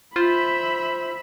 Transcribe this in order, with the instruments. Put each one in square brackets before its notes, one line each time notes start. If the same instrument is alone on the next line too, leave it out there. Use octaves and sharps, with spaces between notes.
[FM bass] F4 [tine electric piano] C5 [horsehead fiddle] E5 B5